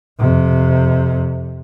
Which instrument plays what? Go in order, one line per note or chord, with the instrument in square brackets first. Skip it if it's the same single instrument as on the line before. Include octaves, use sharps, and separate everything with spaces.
[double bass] F2 C3